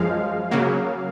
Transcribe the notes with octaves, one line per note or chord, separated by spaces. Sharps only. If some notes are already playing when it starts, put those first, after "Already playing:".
Already playing: F#2 F3 G#3 F5
C#3 F#3 A#3